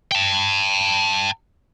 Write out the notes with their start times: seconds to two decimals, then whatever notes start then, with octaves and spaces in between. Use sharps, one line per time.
0.12 G5 A5